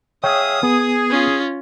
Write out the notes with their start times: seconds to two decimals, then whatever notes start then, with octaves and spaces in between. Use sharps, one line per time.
0.24 G#4 C#5 E5 F5 G5 D#6
0.63 B3 G#4
1.10 C#4 F4